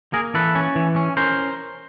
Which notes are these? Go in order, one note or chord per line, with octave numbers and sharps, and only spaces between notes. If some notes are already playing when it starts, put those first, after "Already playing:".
A#3 G#4 A#4
E3 A4 B4
C#4
E3
C#4
C#4 A#4 C5